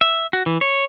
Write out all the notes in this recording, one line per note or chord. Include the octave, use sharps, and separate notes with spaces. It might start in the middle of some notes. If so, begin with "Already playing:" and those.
E5
F#4
E3
C#5